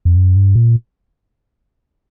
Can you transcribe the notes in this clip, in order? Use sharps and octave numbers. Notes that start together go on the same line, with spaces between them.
F2
F#2
G2
A#2